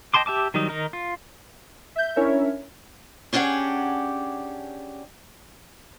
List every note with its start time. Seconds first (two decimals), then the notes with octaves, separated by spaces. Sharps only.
0.14 D#5 G5 A5 C6 D6
0.26 G4 E5 A5 D6
0.54 D#3 F#3 G3 D#4
0.69 D#3 D#4 A#4
0.93 F4
1.96 E5 G6
2.16 C#4 D4 E4 A#4 C#5 E5
3.33 C#4 D4 G4 G#4 F#5